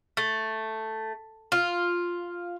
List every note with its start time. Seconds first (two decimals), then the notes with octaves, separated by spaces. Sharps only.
0.17 A3
1.52 F4